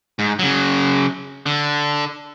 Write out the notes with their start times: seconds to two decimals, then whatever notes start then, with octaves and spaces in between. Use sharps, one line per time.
0.19 G#2
0.39 C#3 F#3
1.46 D3